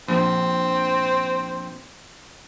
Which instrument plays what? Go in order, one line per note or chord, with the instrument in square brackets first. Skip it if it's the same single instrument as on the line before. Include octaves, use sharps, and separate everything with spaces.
[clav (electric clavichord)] A#1 [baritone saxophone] C4